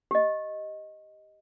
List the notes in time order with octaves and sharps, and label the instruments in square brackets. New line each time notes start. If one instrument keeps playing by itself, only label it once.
[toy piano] G4 D#5